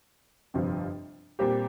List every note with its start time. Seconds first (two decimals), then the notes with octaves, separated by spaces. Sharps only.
0.54 G1 F2 C3 F3
1.39 A#2 G3 C4 G4